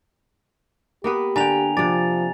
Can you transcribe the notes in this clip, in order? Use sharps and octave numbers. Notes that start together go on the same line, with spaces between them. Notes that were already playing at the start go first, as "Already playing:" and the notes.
A#3 B3 G4 B4
D3 G5 G#5 A#5 F7
C3 F3 D5 A6